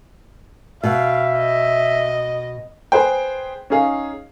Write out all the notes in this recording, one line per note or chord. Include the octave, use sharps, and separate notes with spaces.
B2 E5 F5
D#5
G#4 B4 C5 G5
C#4 D#4 G#4 F5